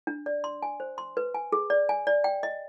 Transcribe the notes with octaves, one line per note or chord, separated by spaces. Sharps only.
D4
D5
C6
G#5
C5
C6
B4
G#5
G#4
D5
G#5
D5
G5
D#5